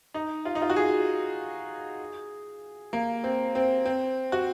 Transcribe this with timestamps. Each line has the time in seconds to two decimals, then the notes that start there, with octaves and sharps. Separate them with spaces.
0.14 D#4
0.45 F4
0.55 D#4
0.62 F4
0.70 F#4
0.76 G#4
2.93 A#3
3.24 C4
3.55 C4
3.85 C4
4.32 F#4